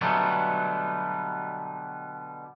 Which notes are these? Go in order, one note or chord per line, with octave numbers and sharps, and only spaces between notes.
B2 D3 F#3 G3 A3 B3